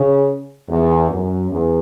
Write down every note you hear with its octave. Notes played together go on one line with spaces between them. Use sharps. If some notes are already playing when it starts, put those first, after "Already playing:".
Already playing: C#3
E2
F#2
E2